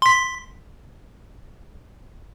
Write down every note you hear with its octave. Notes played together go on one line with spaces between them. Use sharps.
C6 B6